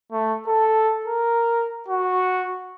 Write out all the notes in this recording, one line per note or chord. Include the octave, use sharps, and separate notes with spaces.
A3
A4
A#4
F#4